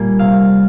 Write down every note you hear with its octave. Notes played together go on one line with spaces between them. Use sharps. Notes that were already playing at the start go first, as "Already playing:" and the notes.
Already playing: A#2 G3 A#3 G#5
C3 F5